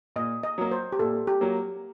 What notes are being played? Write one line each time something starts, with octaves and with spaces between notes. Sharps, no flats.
A#2 D#5
D#5
F#3 A#3
C5
G4
A#2 A4
G4
F#3 A#3